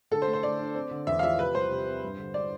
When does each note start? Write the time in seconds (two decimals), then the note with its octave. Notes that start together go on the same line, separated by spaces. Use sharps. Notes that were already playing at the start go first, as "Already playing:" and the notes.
0.11 D3 A4
0.22 C5
0.27 A3
0.33 C5
0.43 D3 D5
0.59 D4
0.75 C4
0.91 D3
1.07 E2 E5
1.19 F5
1.23 F3 E5
1.39 C3 B4
1.55 G3 C5
1.71 C3
1.86 C4
2.03 G2
2.18 D3
2.34 D5